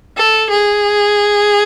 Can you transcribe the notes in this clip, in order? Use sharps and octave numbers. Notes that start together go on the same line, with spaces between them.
A4
G#4